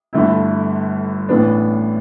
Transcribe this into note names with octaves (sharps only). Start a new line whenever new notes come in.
G1 G2 D3 A3 E4
A1 A2 E3 B3 D4